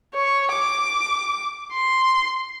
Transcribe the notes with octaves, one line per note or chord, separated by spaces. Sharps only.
C#5
D6
C6